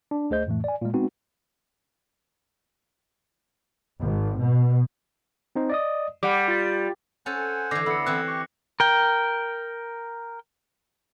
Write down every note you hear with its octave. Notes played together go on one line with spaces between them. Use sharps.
D4
D2 A3 G#4 C5 D#5 G6
F2 A2 E3 A3
D5 G#5
A#2 G#3
G#3 B3 C4 D#4 F#4
G#1
B2
C4 D#4 C5
D5 D#5 D#6
G3 F#5 D6
F4 A6
C#4 A4 C5 F#5 G#5
D3 E3 D6 A#6 C7
D3 B3 E4 E6 C#7
E3 C4 F#6
G4 C#6
A#4 G5